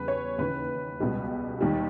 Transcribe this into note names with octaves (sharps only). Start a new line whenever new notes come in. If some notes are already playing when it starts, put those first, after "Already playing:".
Already playing: E2 C#3 G3 B4
C#5
D#2 C#3 E3 B4
C#2 B2 G3
D#2 D#3 G3